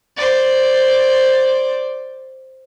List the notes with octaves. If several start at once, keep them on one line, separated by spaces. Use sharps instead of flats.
C5 D5